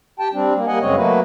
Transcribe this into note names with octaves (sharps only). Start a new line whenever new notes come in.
G4 G5 A5
G3 C4 D4
A#3
G3 A#3 D#5 F#5 G#5
F#2 C#3 G#3 C4 C#5 D#5
F#3 A3 A#3 F#4 B4